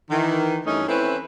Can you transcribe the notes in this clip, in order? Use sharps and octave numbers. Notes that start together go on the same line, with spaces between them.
D#3 E3
G2 E3 A3 C#4 D#4
E3 C4 C#4 E4 A4 B4